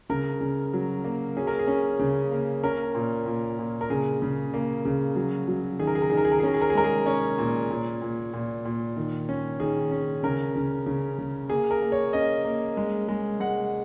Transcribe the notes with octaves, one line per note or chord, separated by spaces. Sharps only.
C#3 A#4
C#3
F#3
A#3
C#4 G#4
A#4
G#4
C#4
C#3
A#3
C#4 A#4
A#2
A#2
A#2
A#4
C#3 G#4
C#3
A#3
C#3
F#3
F#3
D#3 G#4
A#4
G#4
A#4
D#3 G#4
A#4
G#4
A#4
G#4
C#4 A#4
G#4
A#4
G#4
G#3 A#4
G#4
C#4 C#5
A#2
A#2
A#2
A#2
A#2
D#3
C#4
D#3 G#4
C#4
C#3 A#4
C#3
C#3
C#3
A#3 G#4
A#4
A#3
C#5
C#4 D#5
A#3
G#3
G#3
G#3 F#5